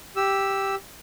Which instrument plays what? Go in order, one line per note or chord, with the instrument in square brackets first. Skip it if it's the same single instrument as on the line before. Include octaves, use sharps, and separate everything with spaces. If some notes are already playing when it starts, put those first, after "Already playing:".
[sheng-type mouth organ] G4 E6